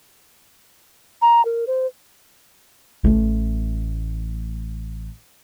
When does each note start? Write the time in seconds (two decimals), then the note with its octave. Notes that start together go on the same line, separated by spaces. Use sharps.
1.22 A#5
1.45 A#4
1.67 C5
3.04 A1 A3